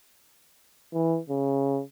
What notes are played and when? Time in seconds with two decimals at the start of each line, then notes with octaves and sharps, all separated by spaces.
0.93 E3
1.30 C#3